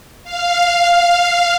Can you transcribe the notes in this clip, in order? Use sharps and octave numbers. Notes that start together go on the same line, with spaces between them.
F5